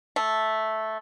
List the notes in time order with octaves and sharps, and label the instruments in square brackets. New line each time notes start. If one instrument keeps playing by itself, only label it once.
[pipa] A3